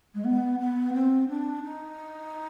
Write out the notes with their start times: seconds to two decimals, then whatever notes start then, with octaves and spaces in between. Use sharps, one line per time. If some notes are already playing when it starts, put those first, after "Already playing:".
0.14 G#3
0.25 B3
0.59 B3
0.93 C4
1.28 D4
1.63 D#4